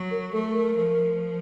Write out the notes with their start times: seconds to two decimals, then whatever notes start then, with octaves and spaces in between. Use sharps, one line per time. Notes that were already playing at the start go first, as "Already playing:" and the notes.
Already playing: F#3
0.11 A#4
0.32 A3 A4
0.53 A#4
0.74 F3